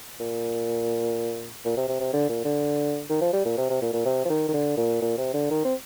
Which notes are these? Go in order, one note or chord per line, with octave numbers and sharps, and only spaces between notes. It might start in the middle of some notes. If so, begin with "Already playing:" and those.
A#2
A#2
C3
C3
C3
D3
A#2
D3
D#3
F3
G3
A#2
C3
C3
A#2
A#2
C3
F3
D#3
D#3
D3
A#2
A#2
C3
D3
D#3
C4